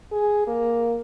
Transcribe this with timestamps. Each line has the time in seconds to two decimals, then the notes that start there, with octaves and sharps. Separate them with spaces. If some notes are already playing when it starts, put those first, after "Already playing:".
0.12 G#4
0.47 A#3